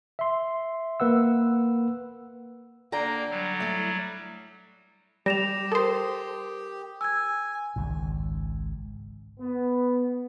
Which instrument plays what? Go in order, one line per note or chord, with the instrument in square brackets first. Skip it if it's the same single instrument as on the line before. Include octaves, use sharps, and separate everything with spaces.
[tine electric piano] E5 C6
A#3 B4 F#5 E6
[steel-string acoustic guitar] D3 G5 A#5 [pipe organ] A#3
[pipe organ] F#3 G3
[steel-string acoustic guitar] A3 E4
[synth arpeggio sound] G3 [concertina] G4 [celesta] A#6 E7 F7
[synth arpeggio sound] A4 C5 [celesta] A#4 D#6
[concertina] G#5 [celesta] E6 G#6
[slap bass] G#1 C#2 G#2
[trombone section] B3